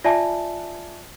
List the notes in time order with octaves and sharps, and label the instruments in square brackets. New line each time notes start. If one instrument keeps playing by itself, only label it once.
[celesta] F4 D5 E5 G#5 A5